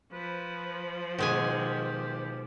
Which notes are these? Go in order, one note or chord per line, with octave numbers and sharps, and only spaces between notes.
F3 B4
B2 D#3 G#3 G4 G#5